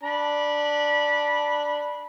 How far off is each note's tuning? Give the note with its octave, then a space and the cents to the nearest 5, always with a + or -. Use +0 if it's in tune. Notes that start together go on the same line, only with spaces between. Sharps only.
D4 +0 B5 -20